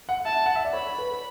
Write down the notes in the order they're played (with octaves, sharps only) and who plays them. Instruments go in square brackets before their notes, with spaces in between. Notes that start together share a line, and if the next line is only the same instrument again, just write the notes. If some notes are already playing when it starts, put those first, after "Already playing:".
[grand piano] F#5
[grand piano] E5 [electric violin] A5
[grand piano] F#5
E5
D5
[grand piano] C#5 [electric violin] B5
[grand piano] B4